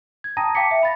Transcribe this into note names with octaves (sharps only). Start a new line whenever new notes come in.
G#6
G5 A5 A#5 D#6 A#6 D#7
F5 G5 A5 D6 B6 C#7
E5
B5 A6 A#6